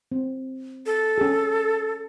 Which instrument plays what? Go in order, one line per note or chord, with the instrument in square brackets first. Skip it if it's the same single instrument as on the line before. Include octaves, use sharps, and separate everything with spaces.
[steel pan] C4
[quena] A4
[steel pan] C#4 G#4